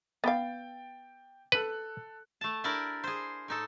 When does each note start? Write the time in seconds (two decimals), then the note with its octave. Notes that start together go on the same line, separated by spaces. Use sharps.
0.24 B3 F5 G5 A6
1.52 A4 B4 F#6
2.41 A3 A5
2.64 D4 E4 G4 A#4 D5
3.04 G#4 C5
3.48 A2 D#4 A4